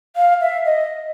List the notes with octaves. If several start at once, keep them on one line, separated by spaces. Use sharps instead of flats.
F5
E5
D#5